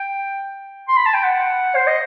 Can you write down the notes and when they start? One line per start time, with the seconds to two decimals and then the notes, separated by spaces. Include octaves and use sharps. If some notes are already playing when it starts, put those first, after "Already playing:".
Already playing: G5
0.88 C6
0.97 B5
1.06 A5
1.14 G5
1.24 F#5
1.75 C5
1.87 D#5